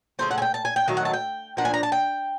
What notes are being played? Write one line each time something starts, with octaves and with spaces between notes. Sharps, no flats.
C#3 F3 A3 C4 C5
F#5
G#5
G5
A5
G#5
G5
D#3 F#3 A3 F5
F#5
A5
G5
F3 A#3 D4 F#5
G#5
A#5
A5
G5